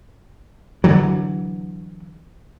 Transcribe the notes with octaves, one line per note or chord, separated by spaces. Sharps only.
D3 E3 F#3